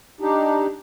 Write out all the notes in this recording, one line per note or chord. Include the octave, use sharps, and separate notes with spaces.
D4 D#4 G4